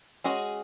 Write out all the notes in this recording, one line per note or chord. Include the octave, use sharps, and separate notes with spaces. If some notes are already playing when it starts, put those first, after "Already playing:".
G#3 C#4 F#4 G#4